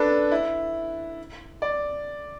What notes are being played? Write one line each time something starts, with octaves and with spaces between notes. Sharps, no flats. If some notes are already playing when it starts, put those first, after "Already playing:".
Already playing: D4 A4 B4
E4
D5